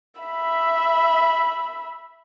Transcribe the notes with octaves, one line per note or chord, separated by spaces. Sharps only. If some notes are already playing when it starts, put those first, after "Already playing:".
E5 B5